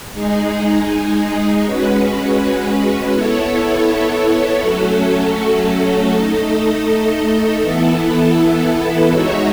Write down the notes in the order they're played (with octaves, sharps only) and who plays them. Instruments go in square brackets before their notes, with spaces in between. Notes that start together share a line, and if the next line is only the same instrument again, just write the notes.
[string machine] G#3 D#4 G#4
G#3 C#4 F#4 B4
B3 E4 A4 C#5
F#3 A3 C#4 F#4 A4
A3 D#4 A4 D#5
E3 B3 E4 A4
G#3 D#4 F#4 C#5 E5